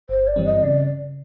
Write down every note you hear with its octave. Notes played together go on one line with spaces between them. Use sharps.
G1 C5
D5
G2 E3 G3 C4
D#5
C#3 D5